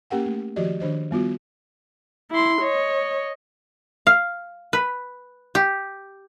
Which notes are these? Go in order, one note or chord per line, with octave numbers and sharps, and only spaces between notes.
A#3 C#4 G4 A#4 F#5 G5
A3
D#3 F3 F#4 G4 D5 D#5
D#3 D4 C5 D#5
G3 B3 F4 F#4
E4 C6
C#5 D#5
F5
B4
G4